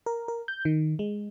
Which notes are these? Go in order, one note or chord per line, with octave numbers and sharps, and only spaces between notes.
A#4
A#4
G6
D#3
G#3